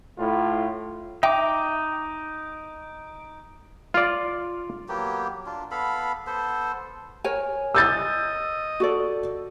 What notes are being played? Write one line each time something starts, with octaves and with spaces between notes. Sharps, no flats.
A2 F4
D#4 E5 G5 D6
F4 D5
F#3 A#3 B3 G4
D4 F4
B3 A4 F5 B5
B3 A4 C5
A#4 C#5 G#5
D#5 E6 G6 A6
F#4 A4 D5